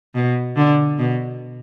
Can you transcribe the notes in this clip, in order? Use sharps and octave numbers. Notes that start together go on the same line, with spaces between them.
B2
D3
B2